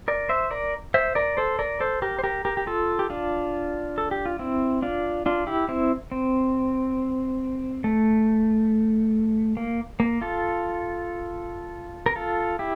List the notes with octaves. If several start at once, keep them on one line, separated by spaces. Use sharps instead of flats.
A#4 D5
C5 E5
A#4 D5
C5 E5
A#4 D5
A4 C5
A#4 D5
A4 C5
G4 A#4
C5
G4 A#4
G4 A#4
G4
F4 A4
G4
D4 F4
A4
G4
F4
C4 E4
D4 F4
D4 F4
E4 G4
C4 E4
C4
A3
A#3
A#3
F4 A4
A#4
F4 A4
E4 G4